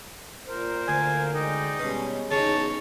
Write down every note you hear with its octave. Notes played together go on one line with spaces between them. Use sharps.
A#2 A#4 C5
D2 G#5
G#3 D#4 D5 G5
B2 G3 G#3 C#4
E2 C#3 D#4 C#5 A5